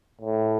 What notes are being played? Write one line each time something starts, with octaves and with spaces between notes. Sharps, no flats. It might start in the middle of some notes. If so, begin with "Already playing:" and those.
A2